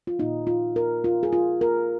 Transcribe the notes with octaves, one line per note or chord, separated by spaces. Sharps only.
F4
A#2 A#3 D#4
F4
A#4
F4
G#4
F4
A#4